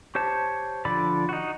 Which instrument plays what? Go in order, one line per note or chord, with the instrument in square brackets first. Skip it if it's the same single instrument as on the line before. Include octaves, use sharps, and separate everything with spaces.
[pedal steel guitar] G4 C5 C#5 A5
D3 F3 D5 B5
D#4 F#4